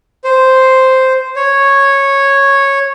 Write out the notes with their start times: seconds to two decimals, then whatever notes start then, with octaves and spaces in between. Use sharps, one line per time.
0.24 C5
1.36 C#5